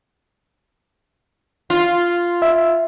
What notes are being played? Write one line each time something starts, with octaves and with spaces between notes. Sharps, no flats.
F4
E5